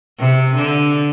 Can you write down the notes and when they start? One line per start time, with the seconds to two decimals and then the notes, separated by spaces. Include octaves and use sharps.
0.18 C3
0.55 D3